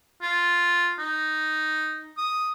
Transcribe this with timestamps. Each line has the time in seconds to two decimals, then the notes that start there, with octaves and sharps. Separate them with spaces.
0.22 F4
0.99 D#4
2.18 D#6